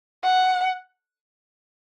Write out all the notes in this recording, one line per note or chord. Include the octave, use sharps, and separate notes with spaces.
F#5